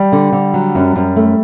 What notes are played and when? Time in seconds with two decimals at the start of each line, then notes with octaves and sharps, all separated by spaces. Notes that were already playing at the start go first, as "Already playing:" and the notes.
Already playing: G3
0.12 D3
0.32 D3
0.54 F#3
0.75 F#2
0.96 F#2
1.16 A3